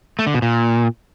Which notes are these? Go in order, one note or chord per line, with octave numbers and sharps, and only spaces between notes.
A3
D3
B2
A#2